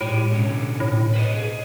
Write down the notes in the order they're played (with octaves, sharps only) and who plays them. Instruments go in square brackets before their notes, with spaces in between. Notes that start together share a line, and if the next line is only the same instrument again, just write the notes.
[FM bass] A2 [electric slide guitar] G#3 G4
[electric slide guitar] B2 D3 C#4
[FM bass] A2
[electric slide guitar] B4 C5 D#5
G#4